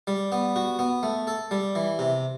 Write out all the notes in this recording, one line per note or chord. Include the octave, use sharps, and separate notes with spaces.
G3
B3
F#4
B3
A3
A4
G3
E3
C3